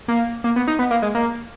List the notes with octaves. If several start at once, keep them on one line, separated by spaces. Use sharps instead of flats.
A#3
A#3
B3
D#4
B3
A#3
G#3
A#3